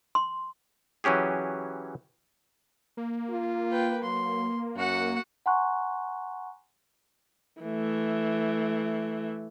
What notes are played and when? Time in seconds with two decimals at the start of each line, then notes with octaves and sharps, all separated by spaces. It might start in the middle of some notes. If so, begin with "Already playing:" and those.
0.15 C6
1.04 E3 F#3 C#4 G4 G#4
2.97 A#3
3.30 F4
3.71 B4 G5
4.03 F#3 C6
4.76 F#2 F#4 F#5
5.46 F#5 G#5 A#5 C6 C#6 F#6
7.62 E3 A3